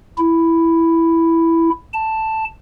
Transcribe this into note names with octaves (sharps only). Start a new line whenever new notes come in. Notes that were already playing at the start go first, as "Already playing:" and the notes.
E4
A5